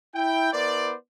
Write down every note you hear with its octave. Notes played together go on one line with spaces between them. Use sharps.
E4 G5
B3 E4 A#4 C5 D5